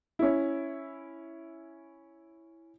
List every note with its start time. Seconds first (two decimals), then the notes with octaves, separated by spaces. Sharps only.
0.19 C#4 E4